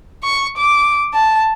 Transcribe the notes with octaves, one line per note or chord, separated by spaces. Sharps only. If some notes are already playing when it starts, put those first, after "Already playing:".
C#6
D6
A5